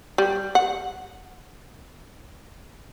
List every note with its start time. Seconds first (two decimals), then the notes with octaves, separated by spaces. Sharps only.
0.18 G3
0.55 F#5